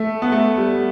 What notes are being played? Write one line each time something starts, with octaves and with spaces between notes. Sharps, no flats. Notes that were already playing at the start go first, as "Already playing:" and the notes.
Already playing: A3
B3
A3
G3